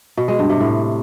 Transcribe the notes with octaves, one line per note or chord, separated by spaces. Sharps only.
B2
G#3
G2
C3
A2